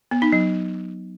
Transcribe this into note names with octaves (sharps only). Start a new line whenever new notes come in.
B3
D#4
F#3